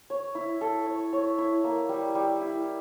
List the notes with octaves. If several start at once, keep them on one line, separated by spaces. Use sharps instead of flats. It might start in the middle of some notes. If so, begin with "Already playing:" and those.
C#5
E4
A4
C#5
C#5
E4
A#3
G3
G3
E4